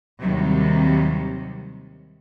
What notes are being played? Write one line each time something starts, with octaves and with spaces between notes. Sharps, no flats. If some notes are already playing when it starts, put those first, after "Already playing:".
D#2 C3 D#3 F#3 G3